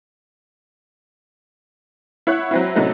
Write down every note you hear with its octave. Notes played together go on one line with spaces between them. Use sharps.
E4 C#5 F#5 F#6
F#3 C4 E4
A2 C3 F#3 A3 C#4 D#4